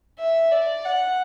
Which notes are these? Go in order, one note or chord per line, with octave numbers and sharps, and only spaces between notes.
E5
D5
F#5